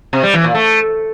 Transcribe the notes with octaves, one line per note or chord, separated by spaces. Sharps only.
C3
G3
E3
A#2
A3